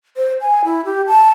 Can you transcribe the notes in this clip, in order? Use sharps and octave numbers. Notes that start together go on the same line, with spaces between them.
C5
G#5
E4
G4
A5